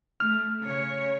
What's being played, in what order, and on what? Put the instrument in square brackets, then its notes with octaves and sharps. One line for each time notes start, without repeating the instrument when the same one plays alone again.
[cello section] A3 [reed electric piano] F6
[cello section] C#3 C#5